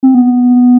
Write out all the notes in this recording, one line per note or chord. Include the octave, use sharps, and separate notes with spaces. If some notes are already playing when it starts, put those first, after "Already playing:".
C4
B3